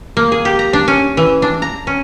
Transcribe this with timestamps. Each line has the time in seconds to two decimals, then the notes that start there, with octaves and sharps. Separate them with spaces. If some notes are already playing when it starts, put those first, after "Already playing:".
0.17 A#3
0.32 G#4
0.45 G4
0.59 A#5
0.73 D4
0.88 C#4
1.17 E3
1.42 D4
1.62 A#5
1.87 C#4